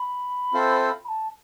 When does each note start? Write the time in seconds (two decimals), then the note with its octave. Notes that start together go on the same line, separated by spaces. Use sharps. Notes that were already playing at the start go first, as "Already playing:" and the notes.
Already playing: B5
0.53 C4 F4 A4 C5 E5
1.05 B5
1.08 A5